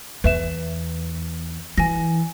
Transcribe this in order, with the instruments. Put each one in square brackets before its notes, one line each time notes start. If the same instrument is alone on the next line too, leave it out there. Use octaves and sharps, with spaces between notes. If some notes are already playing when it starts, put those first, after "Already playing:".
[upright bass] E2 [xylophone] B4 E5 E7
[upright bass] E3 [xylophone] G#5 A#6